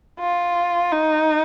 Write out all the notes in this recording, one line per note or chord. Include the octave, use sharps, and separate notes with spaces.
F4
D#4